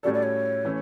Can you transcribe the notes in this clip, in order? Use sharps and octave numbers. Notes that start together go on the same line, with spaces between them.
A2 G3 C#4 F#4 A4 D5
D5
C#5
E3 A3 C#4